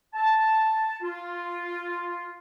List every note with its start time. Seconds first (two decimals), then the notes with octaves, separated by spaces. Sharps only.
0.14 A5
1.02 F4